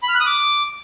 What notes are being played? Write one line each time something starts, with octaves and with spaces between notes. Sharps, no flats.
B5
F6
F#6
D#6
D6